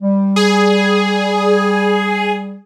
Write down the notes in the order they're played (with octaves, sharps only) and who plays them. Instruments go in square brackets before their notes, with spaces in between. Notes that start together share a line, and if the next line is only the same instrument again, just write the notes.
[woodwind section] G3
[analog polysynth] G#4